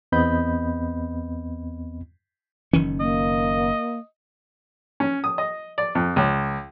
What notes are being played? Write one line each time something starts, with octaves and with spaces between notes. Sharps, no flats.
E2 B3 C4 D#5 B5 G6
F#1 D#3 E3 C#4
A#3 D#5
C#4
D#6
D#5
D5
F2
C#2